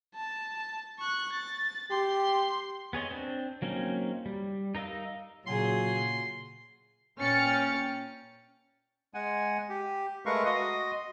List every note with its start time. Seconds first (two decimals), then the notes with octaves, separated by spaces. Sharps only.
0.15 A5
0.99 C#6 F#6
1.32 A6
1.91 G4 C6
2.93 B3 G#4 C#5 D#5
3.11 C4 D4
3.62 F#3 A#3 C4 C#4 D#4
4.26 G3
4.75 D#4 A#4 D#5 F5 E6
5.46 A#2 C#3 F#3 F4 G#4 C6
7.18 A#2 C#4 G5 F6 A6 C#7
9.14 G#3 F#5 G#5
9.69 G4
10.26 G#3 A3 A#4 B4 F5 C#6
10.46 F#4 D#5 C6 D#6